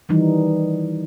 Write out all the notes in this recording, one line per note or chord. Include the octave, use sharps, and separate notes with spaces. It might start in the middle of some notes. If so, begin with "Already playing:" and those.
D#3 E3 G3 D#4